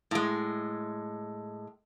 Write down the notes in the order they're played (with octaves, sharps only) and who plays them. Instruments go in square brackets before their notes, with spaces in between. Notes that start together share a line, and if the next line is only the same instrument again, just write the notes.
[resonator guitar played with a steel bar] A2 G#3